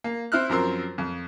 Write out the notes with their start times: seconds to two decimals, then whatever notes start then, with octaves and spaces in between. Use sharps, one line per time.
0.04 A#3
0.32 C4 E4 F6 F#6
0.49 F#2 F3 C4 A#4 E6
0.98 F2